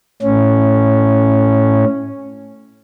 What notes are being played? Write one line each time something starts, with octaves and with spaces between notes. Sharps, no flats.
A2 C#4